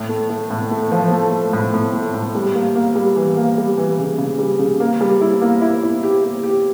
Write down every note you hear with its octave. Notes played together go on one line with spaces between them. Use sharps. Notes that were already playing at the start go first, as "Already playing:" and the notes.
Already playing: A2
A3
A3
A2
A3
F3
A3
A3
A2
A2
A3
A2
G3
A#3
A#3
G3
E3
A#3
G3
E3
C#3
C#3
G3
C#3
A#3
G3
E4
A#3
E4
E4
G4
G4
G4